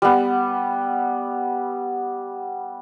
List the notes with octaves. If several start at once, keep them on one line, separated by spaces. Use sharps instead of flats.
G3 B3